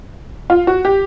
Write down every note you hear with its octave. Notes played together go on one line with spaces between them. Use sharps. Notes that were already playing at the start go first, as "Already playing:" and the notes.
F4
F#4
G4